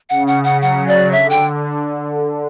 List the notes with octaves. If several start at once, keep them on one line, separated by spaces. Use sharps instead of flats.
C#3 F#5
F#5
F#5
F#3 F#5
D5
D3 E5
G5